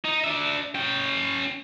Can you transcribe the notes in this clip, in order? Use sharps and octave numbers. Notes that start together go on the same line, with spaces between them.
D#4
D4 E5
C#4 G5